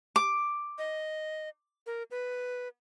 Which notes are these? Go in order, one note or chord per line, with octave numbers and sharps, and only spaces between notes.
D6
D#5
A#4
B4